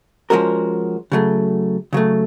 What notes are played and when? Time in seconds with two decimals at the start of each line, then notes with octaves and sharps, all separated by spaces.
0.30 F3 G#3 C#4 F#4 A#4
1.12 C#3 F#3 A3
1.93 C#3 F#3 A3